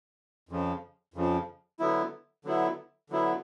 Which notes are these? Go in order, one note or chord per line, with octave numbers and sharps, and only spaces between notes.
F2 C#3 F3
F2 C#3 F3
D3 F#3 B3 E4
D3 F#3 B3 E4
D3 F#3 B3 E4